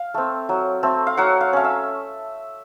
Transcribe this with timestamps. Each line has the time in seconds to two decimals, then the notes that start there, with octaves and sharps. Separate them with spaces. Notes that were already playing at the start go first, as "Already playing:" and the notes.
Already playing: F5
0.14 A3 C4
0.49 F#3
0.83 A3 C4
1.07 F5
1.17 F#3 F#5
1.41 F5
1.53 A3 C#4 F5
1.64 E5